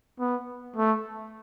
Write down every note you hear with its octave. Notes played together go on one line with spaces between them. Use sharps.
B3
A3